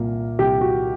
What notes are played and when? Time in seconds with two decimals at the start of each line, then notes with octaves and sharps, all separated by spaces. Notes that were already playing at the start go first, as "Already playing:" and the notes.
Already playing: C2 A#2 A#3
0.39 C2 G4
0.61 F#4